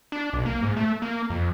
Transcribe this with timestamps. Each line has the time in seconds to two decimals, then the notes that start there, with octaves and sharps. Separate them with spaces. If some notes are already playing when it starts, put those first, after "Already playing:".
0.12 D4
0.33 B1
0.46 A#3
0.63 G#2
0.76 A3
1.02 A#3
1.30 F2